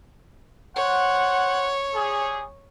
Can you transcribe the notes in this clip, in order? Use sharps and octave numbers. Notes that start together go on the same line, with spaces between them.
C5 C#5 F#5
G3 G#4